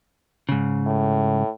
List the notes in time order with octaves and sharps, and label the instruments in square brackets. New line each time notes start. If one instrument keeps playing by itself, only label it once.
[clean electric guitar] G#2 C#3
[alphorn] A2